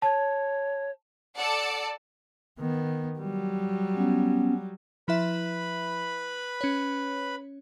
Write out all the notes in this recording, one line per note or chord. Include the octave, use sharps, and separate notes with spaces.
C#5 A5
A4 D5 F#5 A5
D#3 B3
F#3 G3
B3 C#4
F3 E4 B4 E5 B5
C#4 C#5